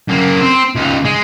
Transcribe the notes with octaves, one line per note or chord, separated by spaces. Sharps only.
F#2 A#3
C4
C#2 D#4
G#3